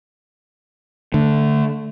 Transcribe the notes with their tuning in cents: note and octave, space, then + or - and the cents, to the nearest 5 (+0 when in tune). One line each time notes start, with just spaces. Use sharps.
D3 +0 A3 +0